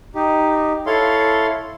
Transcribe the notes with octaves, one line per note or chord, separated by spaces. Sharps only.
D#4 G4
E4 A4 C#5 F5 C6